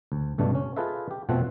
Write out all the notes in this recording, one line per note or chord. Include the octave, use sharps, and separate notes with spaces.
D2
C#2 G2 B2 A3 D4
C#4
F4 G#4 A4 B4 D#5 E5
G4
F2 B2 F3 A3 C4 F#5